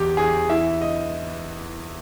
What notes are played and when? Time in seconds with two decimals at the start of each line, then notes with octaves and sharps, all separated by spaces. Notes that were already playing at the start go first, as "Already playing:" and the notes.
Already playing: E2 G4
0.17 E2 G#4
0.50 E3 E5
0.82 D#5